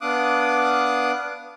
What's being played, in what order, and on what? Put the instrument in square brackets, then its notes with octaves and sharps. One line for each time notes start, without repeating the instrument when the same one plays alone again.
[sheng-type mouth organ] B3 D4 F5 D6 D#6 F#6